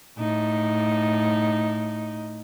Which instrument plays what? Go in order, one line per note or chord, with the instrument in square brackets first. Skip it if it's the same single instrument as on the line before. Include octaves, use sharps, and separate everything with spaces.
[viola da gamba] A2 D#4